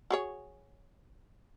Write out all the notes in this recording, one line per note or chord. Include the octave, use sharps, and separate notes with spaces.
F#4 G#4 C#5